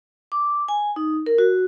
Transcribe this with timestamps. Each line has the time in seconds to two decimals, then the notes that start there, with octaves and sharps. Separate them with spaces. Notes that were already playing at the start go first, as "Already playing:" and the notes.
0.32 D6
0.68 G#5
0.96 D#4
1.26 A#4
1.38 F#4